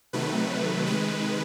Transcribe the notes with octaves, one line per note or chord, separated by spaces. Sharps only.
C3 D#3 F#3 A3 B4
C3 D#3 G#3 B4